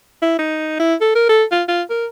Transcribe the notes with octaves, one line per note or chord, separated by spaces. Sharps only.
E4
D#4
E4
A4
A#4
A4
F4
F4
A#4